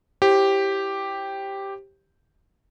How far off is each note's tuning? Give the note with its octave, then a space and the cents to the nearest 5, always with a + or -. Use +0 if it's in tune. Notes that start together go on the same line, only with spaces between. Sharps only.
E4 +0 G4 +0 C5 +30